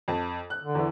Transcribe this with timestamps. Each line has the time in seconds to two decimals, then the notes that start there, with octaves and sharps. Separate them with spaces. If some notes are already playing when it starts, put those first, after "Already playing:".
0.08 F2 A5
0.50 F#6
0.63 D3
0.75 E2 E3